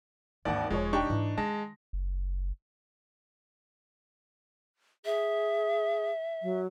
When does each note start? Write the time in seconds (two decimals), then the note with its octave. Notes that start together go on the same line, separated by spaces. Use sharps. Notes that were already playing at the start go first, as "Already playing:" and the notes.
0.45 G#1 D#2 E3 D4 D5 F#5
0.70 E1 F3 G#3 F4 C#5
0.93 D4 D#4 G4 G5 C#6
1.10 G#2 E3
1.38 D#3 G#3 A5 A#6
1.93 F#1
5.05 G#4 E5
6.42 F#3